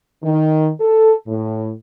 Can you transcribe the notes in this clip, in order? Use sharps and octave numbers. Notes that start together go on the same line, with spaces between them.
D#3
A4
A2